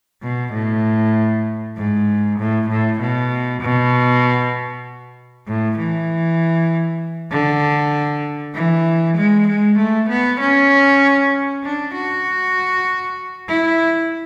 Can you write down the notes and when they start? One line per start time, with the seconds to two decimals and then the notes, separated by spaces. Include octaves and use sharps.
0.23 B2
0.53 A2
1.77 G#2
2.39 A2
2.69 A2
3.00 B2
3.62 B2
5.47 A2
5.78 E3
7.31 D3
8.54 E3
9.17 G#3
9.48 G#3
9.78 A3
10.09 B3
10.40 C#4
11.63 D4
11.94 F#4
13.48 E4